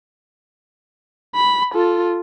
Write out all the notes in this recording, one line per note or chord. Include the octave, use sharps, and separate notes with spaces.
B5
F4 A4